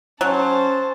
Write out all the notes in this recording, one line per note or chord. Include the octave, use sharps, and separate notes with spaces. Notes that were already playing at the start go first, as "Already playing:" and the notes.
F#3 C#4 C5 A5